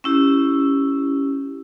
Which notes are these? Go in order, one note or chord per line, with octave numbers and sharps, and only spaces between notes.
C#4 E4 G4